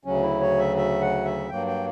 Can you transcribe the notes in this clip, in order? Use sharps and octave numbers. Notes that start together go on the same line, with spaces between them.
D2 C#3 F#3 C#4
E4
C#5
E5
E5
F#5
E5
G2 F#3 A#3 G5
G5